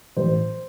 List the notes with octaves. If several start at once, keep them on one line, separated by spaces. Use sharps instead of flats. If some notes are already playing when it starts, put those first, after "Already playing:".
A1 C5